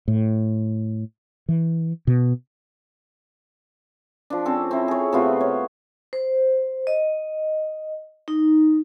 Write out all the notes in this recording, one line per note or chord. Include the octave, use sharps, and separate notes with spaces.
A2
E3
B2
F3 D4
C4 C#4 A4
C4 E4
G#4 C#5
C3 A3 B3 F4
C#5
C5
D#5
D#4